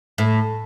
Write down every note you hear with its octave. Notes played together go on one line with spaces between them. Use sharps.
A2